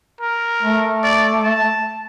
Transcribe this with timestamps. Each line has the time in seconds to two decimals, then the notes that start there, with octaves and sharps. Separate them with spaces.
0.21 A#4
0.63 A3
1.04 D5
1.43 A5